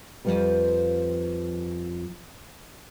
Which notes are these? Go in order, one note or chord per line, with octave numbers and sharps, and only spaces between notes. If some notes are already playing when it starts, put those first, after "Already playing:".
F2 B2 F3 G3 B4